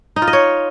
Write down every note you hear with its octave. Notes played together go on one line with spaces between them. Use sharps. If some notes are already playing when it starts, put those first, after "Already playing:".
D#4
F4
D#5
C#5